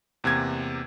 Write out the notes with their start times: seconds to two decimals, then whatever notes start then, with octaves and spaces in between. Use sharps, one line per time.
0.24 E2 C3 A#3 G#6